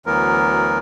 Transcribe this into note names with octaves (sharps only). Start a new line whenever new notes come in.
D2 E3 F#3 B3 A#4